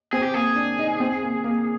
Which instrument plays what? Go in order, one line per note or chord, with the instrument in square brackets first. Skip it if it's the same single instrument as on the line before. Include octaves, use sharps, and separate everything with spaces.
[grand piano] C4 [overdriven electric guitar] G#4
[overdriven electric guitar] G4
[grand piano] A#3 [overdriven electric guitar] G#4
[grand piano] D4
D#4
C4
A#3
A#3